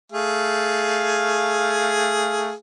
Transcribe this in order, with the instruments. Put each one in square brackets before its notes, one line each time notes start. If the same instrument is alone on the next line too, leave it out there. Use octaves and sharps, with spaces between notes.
[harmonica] A3 G#4 F5